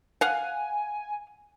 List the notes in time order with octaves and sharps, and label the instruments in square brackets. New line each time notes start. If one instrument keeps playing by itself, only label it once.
[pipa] F5 F#5 [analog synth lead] G#5